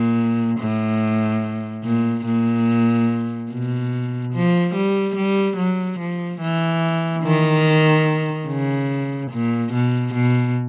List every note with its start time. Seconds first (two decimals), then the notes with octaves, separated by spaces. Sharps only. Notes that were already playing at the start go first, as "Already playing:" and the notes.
Already playing: A#2
0.60 A2
1.84 A#2
2.25 A#2
3.50 B2
4.34 F3
4.75 G3
5.16 G3
5.57 F#3
5.99 F3
6.41 E3
7.23 D#3
8.48 C#3
9.31 A#2
9.73 B2
10.14 B2